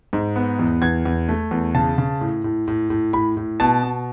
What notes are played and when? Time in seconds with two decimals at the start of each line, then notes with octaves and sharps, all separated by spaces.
0.13 G#2
0.36 B3
0.59 E2
0.82 E2 G#6
1.05 E2
1.29 A3
1.51 E2
1.75 C#3 A5
1.98 C#3
2.21 A2
2.44 A2
2.68 A2
2.90 A2
3.13 A2 B5
3.37 A2
3.60 B2 A5
3.83 B2